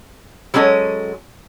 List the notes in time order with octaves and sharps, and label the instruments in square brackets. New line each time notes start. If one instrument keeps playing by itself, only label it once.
[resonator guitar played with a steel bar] F#3 G#3 C#4 A4 D#5